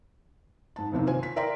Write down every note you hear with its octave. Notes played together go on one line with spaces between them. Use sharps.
G#2 A5
F#1 D#2 C3 D#3
F4 C5 G#5
B6
A#4 D5 E5 G5 A#5 C6